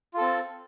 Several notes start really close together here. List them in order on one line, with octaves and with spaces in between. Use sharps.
F4 A4 C4